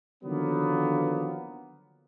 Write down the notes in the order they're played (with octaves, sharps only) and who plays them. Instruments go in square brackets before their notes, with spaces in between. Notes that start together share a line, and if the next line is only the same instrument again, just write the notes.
[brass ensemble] D3 D#3 F3 F#3 A#3 B3